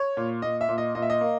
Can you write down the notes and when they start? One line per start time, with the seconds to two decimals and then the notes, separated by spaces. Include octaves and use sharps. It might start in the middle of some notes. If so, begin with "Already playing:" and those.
Already playing: C#5
0.17 A#2
0.42 A#2 D#5
0.61 E5
0.69 A#2
0.78 D#5
0.95 A#2 D#5
1.02 E5
1.10 D#5
1.21 A#3